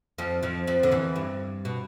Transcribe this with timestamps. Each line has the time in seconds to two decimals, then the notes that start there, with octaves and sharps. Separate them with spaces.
0.18 F2 F3
0.43 F2 F3
0.67 F2 F3
0.83 D3
0.91 E2 E3
1.16 G2
1.65 B2